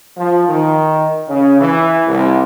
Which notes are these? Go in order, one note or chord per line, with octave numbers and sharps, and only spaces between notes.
F3
D#3
C#3
E3
C2